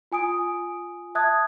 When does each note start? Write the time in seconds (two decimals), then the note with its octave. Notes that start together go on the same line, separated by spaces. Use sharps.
0.12 F4 G#5 D#6 D7
1.15 E5 A5 D#6 F#6 G#6